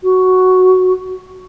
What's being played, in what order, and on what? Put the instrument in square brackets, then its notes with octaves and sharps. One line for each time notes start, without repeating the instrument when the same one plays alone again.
[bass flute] F#4